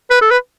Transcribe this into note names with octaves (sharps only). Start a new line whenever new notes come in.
B4
A4
B4